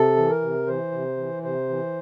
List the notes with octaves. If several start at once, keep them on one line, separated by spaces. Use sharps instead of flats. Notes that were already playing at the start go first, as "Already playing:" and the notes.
Already playing: C3 A4
E3
A#4
C3
E3 C5
C3
E3
C3 C5
E3